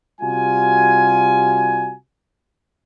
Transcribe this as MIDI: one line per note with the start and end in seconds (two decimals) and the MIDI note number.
0.21 1.95 48
0.21 1.95 55
0.21 1.95 65
0.21 1.95 66
0.21 1.95 80